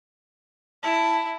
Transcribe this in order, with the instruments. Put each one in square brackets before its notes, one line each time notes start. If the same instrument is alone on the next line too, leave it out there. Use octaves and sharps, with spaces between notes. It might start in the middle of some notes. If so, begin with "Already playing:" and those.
[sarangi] E4 [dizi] A5